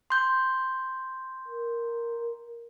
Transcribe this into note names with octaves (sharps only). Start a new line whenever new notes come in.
C6 G6
A#4